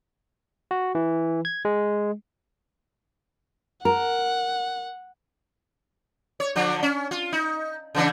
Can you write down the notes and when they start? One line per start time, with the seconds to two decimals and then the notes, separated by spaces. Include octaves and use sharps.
0.71 F#4
0.95 E3
1.45 G#6
1.65 G#3
3.85 A#4 F#5
6.40 C#5
6.55 D3 F3 D4
6.83 C#4
7.11 F4
7.33 D#4
7.95 C#3 E3 D4